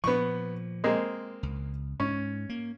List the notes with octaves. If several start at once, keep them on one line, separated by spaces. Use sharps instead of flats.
A#2 F3 B3 C#6
G#3 A#3 C4
C#2
G#2 C#4
A#3